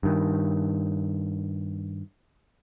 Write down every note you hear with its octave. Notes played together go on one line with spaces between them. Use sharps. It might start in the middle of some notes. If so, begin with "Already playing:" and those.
G2 D#3